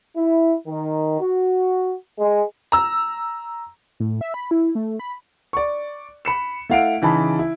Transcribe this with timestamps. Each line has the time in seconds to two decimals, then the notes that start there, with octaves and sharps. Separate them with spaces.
0.17 E4
0.67 D#3
1.21 F#4
2.19 G#3
2.72 A#5 E6
4.00 A2
4.21 E5
4.34 B5
4.51 E4
4.75 A3
4.99 B5
5.53 D5 C#6
6.25 B5 C#7 E7
6.69 A3 E4 F5 F#5 D7
7.02 C#3 E3 D#4 A5 B5
7.39 E4